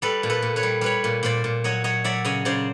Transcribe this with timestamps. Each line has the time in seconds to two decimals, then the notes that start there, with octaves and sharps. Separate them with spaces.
0.02 G3 A4 B4
0.23 A#2
0.30 A4 B4
0.42 A#2
0.56 B4 C#5
0.63 G3
0.81 G3 B4 C#5
1.04 A#2
1.23 A#2 C5 D5
1.44 A#2
1.64 F#3 C#5 D#5
1.84 F#3 C#5 D#5
2.04 F#3 D5 E5
2.24 C#3 C#5 D#5
2.45 C#3 C5 D5